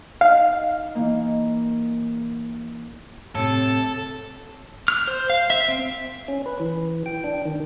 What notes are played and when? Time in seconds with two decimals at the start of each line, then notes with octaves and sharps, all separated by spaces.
0.21 D#4 F5
0.95 E3 A#3 D#4
3.35 A2 C3 A4
4.88 F6
5.08 C5
5.30 F5
5.50 E5
5.68 C4
6.28 C#4
6.46 B4
6.60 E3
7.06 G5
7.24 D4
7.45 D#3